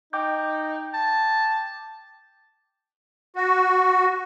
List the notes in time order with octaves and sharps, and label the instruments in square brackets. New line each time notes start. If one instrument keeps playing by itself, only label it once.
[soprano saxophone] D#4 [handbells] G5 D6 G6
[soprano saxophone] A5
[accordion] F#4